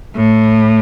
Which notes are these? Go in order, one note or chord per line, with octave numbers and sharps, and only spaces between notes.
A2